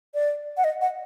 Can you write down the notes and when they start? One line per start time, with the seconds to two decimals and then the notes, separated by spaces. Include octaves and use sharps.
0.14 D5
0.57 F#5
0.64 D#5
0.81 F#5